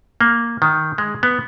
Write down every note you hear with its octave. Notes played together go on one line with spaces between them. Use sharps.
A#3
D#3
G#3
B3